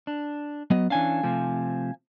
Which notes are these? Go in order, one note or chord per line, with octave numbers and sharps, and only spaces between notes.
D4
F#3 B3 D#5
E3 C#4 D4 F5 G#5
C3 F3 A3